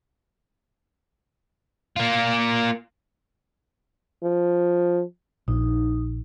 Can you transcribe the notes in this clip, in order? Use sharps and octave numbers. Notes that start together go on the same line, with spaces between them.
A#3 F4
F3
A#1 D#4